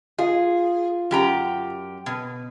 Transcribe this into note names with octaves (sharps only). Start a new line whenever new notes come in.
F4 G#4
F#2 G4 A#5
B2